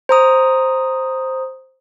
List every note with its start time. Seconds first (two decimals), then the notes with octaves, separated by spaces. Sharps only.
0.09 C5 A#5 D#6